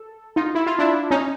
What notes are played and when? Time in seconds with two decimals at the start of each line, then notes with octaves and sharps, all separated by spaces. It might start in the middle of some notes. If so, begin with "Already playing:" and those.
Already playing: A4
0.36 D#4 F4
0.55 E4
0.66 F4
0.79 D4 E4
1.11 C#4 D#4